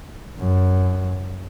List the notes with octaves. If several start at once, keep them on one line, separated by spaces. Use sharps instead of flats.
F#2